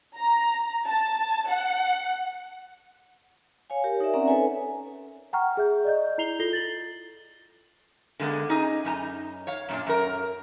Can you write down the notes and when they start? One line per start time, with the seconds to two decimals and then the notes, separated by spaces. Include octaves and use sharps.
0.18 A#5
0.87 A5
1.49 F#5
3.70 C#5 F5 G#5
3.84 G4 A#4
4.00 D#4 A#4 D5 E5
4.13 C4 C#4 D5 E5 F#5 A#5
4.28 A4 B4 C#5 G#5
5.33 F#5 G5 A#5 C#6 F6
5.57 G#4 E5 G6
5.84 D5 D#5 G6
6.18 E4 A#5 G6 C7 F7 G7
6.39 F4 A4 A#6 C7 G7
6.53 A6 F#7
8.20 D3 G#3 A#3 B3
8.49 C#4 D#4 G#4 D#5
8.85 F#2 D#4 A5 A#5
9.47 C#5 F5
9.69 F#2 A#2 D4
9.87 F#2 A#4